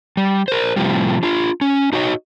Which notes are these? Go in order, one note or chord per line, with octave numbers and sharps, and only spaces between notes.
G3
A#4 C5
A2 C3 F3 G3
D4 F4
C#4
D#4 F#4 C#5 D#5